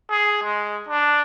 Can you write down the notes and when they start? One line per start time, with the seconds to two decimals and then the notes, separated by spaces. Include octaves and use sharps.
0.10 G#4
0.43 G#3
0.88 D4